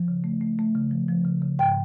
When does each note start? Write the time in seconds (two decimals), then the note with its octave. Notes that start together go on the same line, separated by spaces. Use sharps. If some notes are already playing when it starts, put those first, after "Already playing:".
Already playing: F3
0.08 C#3
0.24 A3
0.41 A3
0.59 A3
0.75 C#3
0.91 F3
1.08 F3
1.25 C#3
1.42 C#3
1.59 G#2 G5